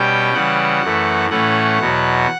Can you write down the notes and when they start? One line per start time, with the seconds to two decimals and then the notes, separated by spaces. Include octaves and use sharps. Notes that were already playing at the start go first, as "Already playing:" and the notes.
Already playing: B2 G3 C#4 G5
0.33 C#3 E3 G3 F#5
0.82 F#2 E3 A3
1.30 A2 E3 A3 C#4 F#5
1.79 E2 B2 F#3